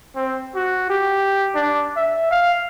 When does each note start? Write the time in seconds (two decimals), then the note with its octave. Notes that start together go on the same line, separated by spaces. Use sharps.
0.16 C4
0.55 F#4
0.90 G4
1.55 D4
1.96 E5
2.31 F5